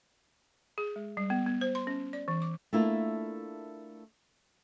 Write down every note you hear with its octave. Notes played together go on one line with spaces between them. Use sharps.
G#4
G#3
G3
B3
B3
C5
C6
C#4
D5
E3
D6
A3 A#3 D4 E4 F4 A#4